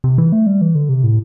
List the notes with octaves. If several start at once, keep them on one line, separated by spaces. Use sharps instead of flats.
C3
E3
A3
G3
E3
D3
C3
A2